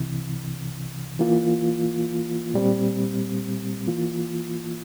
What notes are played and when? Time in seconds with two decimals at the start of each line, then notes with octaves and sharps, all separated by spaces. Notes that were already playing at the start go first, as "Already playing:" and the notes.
Already playing: C2 C3 E3
1.19 E3 A#3 F4
2.54 A#2 G3 C4
3.87 E3 A#3 F4